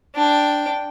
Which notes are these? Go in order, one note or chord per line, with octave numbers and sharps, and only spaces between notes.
D4 G5